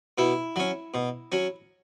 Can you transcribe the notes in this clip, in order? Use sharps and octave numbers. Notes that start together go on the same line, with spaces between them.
B2 E4
F#3 C#4
B2
F#3 C#4